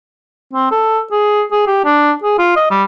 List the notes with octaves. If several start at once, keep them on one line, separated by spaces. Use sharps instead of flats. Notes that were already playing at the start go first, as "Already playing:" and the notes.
C4
A4
G#4
G#4
G4
D4
G#4
F4
D#5
G3